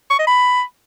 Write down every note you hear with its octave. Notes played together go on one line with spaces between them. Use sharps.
C#6
D#5
B5